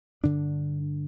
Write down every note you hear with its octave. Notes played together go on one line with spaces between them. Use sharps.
G2 D3 D4